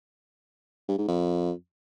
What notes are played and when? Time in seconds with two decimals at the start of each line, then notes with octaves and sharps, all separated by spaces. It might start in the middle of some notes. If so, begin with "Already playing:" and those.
0.88 G2
0.98 G#2
1.08 F2